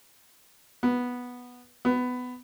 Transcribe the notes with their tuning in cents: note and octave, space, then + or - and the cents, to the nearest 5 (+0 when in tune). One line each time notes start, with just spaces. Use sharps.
B3 -5
B3 +15